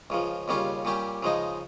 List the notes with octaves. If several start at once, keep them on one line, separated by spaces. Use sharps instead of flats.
C#2 C#3 F3
D#2 C#3 G3 C#4 F4
A#2 G3 C#4 G4
C#3 F3 G#3 D#4